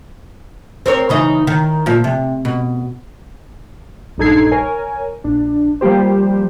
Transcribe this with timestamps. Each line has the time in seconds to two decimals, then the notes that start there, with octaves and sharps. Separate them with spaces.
0.86 C4 A#4 C#5
1.09 C#3 E3 D#4
1.47 D#3
1.86 A#2 F3
2.04 C3
2.45 B2
4.18 A#1 G2 D#4 A4 G#6 C7
4.51 A#4 C#5 G#5
5.24 A#1 D4
5.81 F3 G3 A#3 G4 C5